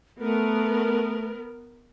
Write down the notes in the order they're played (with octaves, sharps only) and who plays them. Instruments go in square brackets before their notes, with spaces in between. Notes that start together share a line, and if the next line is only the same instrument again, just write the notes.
[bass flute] A3 [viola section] B3 A#4